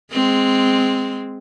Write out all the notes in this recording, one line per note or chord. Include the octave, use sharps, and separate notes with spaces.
G#3 C4